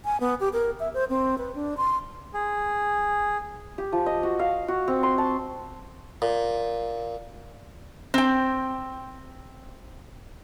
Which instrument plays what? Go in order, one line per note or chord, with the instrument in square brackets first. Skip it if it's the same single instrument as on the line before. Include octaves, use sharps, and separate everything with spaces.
[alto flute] G#5
B3
G4
A#4
E5
C5
C4
B4
D4
C6
[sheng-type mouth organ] G#4
[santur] G4
F3
D#5
F#4
F5
F#4
C4
C6
A5
[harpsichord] A#2
[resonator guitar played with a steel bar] C4 G5